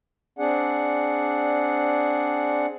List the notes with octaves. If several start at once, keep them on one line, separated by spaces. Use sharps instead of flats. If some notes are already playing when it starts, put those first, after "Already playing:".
C4 D4 G#4 D5 F#5